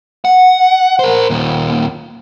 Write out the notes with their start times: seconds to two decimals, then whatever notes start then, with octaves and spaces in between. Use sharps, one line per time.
0.25 F#5
0.99 A#4 C5
1.30 D#2 A#2